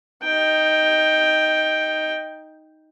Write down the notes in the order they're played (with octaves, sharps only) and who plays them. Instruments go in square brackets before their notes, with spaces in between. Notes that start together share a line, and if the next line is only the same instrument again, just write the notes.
[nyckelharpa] D#4 G5